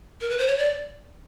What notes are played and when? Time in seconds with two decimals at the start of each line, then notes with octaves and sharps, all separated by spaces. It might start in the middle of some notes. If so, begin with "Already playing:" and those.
0.21 A#4
0.30 B4
0.38 C5
0.47 C#5
0.58 D5